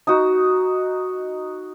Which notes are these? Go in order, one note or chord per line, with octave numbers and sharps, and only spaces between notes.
D#4 F#4